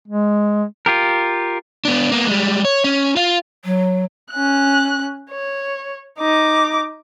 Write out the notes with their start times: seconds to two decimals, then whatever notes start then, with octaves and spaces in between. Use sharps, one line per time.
0.08 G#3
0.86 F4 G4 A#4
1.85 B3 D4
2.12 A#3 B3
2.27 G3 G#3
2.65 C#5
2.84 C#4
3.16 F4 F5
3.64 F#3
4.31 C#4 F#6
5.30 C#5
6.19 D#4 D6